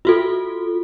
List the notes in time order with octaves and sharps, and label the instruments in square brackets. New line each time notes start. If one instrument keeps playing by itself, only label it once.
[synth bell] F4 F#4 A4